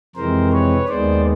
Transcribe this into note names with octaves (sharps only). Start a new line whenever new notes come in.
F2 C3 E3 G#3 C4 A#4 C5
B4 C#5
D#2 D#3 G#3 B3 C5 D5